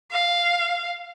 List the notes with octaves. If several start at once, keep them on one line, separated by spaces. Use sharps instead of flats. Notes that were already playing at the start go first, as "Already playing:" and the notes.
F5